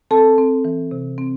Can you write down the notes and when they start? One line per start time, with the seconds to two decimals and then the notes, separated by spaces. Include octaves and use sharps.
0.11 C4 A4 A5
0.38 C4
0.65 E3
0.91 C3
1.18 C4